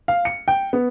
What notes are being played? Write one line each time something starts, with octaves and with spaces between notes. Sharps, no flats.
F5
C#7
G5
B3